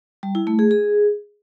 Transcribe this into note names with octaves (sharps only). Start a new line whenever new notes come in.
G3
E4
A3
G#4
G#4